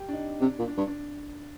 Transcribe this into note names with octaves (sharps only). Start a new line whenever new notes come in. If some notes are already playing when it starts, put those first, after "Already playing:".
Already playing: G4
D4
D#4
C3 D4
A#2
D4
G2
D4